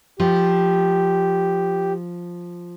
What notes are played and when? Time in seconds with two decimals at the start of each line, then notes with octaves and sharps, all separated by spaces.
0.20 F3 G4